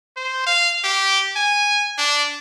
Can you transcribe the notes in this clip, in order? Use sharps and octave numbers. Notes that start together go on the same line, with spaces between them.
C5
F5
G4
G#5
D4